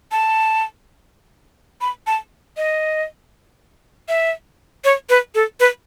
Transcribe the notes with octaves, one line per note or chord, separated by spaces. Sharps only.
A5
B5
A5
D#5
E5
C#5
B4
A4
B4